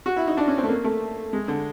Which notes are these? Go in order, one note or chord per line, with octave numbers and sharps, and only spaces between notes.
F#4
E4
D#4
D4
C#4
C4
A3
A#3
A3
G#3
D3